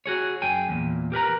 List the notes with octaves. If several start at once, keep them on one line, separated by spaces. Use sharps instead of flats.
F#4 G#4 C#5
F#2 G#4 G5 G#5
E2 A#2
G4 A#4 B4 A#5